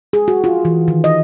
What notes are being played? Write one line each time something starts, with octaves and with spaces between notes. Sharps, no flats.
G#4
F#4
F4
E3
D#3
D#5